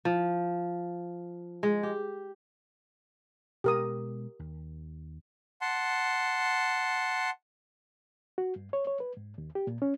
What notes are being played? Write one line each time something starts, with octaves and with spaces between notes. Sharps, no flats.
F3
G#3
G4
B2 G#3 G4 A#4 D#6
D#2
F#5 A5 C6
F#4
G2
C#5
C#5
B4
G#2
D#2
G4
A#2
C#4